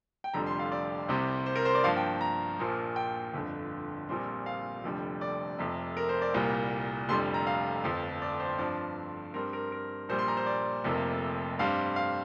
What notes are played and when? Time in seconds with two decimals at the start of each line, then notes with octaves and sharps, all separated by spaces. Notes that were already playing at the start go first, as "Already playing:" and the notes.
0.24 G5
0.34 F1 F2 D3 G3 A#5
0.46 C6
0.59 F5
0.72 D5
1.09 C2 C3 G3 C4
1.46 C5
1.56 A#4
1.65 C5
1.75 D5
1.84 G2 F3 A#3 F5
1.96 G5
2.21 A#5
2.59 A#1 A#2 F3 A#3
2.96 G5
3.34 G1 F2 D3
4.09 A#1 A#2 G3 C4
4.46 F5
4.84 F1 F2 D3 G3
5.21 D5
5.59 F1 F2 C3
5.97 A#4
6.09 C5
6.22 D5
6.34 C2 A#2 G3 A#3
7.09 F1 F2 D3 G3 C6
7.34 A#5
7.47 F5
7.84 G1 F2 F3
8.22 D5
8.40 C5
8.59 G2 F3 C4 D5
9.34 G2 G3 C4 A#4
9.53 A#4
9.72 A#4
10.09 A#1 A#2 G3 C5
10.18 C6
10.28 A#5
10.37 C5
10.46 D5
10.84 F1 F2 C3 A#3
11.59 G2 G3 C4 F5
11.96 F5